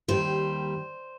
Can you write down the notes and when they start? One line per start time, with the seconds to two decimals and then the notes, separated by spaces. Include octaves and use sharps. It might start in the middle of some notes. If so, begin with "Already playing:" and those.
0.08 D#2 D#3 G3 C5